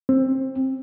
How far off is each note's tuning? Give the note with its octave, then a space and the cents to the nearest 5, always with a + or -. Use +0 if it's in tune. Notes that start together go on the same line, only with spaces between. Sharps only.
C4 +20